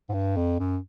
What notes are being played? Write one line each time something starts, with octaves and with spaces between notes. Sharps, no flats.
G#2
G2
F2
F#2